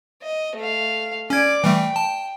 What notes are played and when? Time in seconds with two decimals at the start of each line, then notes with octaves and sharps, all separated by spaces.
0.22 D#5
0.56 A3 F5
1.30 C#4 D5 D6 G#6
1.64 E3 G3 A3 G5
1.96 A5